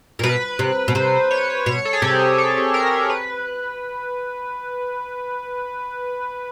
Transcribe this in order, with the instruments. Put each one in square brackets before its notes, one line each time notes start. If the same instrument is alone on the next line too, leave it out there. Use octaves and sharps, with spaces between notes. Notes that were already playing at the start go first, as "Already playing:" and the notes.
[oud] A#2 [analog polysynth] A#4
[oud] B2 [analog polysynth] B4
[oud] C3
B2
[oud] C3 [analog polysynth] C5
[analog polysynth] C#5
[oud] B2 [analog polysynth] C#5
[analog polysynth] A4
G#4
[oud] C3 [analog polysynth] G4
[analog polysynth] A4
A#4
B4